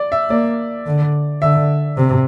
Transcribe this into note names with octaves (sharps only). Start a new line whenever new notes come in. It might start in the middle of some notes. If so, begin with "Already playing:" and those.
Already playing: D5
E5
A#3 D5
D3
D3 E5
C3